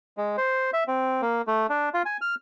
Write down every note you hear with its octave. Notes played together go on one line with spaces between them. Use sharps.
G#3
C5
E5
C4
A#3
A3
D4
F4
G#5
F6